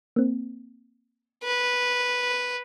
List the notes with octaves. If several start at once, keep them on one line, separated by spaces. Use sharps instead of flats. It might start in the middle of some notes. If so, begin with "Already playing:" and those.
A#3 C4
B4